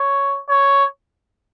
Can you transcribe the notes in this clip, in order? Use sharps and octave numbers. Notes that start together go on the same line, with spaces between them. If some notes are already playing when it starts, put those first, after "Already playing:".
Already playing: C#5
C#5